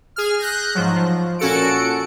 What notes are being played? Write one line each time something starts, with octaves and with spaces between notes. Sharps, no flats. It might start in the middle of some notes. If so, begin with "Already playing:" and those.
G#4 F6
F#6 G6 A#6
G#2 F3 F#3
F3
A#2 C#4 F#4 A4 C#7 D7